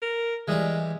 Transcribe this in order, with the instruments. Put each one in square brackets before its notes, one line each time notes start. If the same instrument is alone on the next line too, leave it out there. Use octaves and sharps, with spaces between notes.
[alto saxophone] A#4
[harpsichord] E3 G3 G4 [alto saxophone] G#3